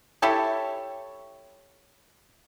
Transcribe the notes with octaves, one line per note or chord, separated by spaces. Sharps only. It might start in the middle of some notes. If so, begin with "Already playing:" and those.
E4 G4 A4 C#5